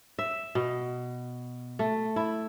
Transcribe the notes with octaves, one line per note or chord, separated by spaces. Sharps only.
E5
B2
A3
E4